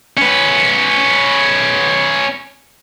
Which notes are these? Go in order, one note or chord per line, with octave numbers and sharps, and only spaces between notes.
C#4 B4